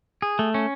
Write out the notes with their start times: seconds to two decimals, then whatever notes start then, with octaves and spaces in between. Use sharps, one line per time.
0.22 G#4
0.39 A3
0.54 C#4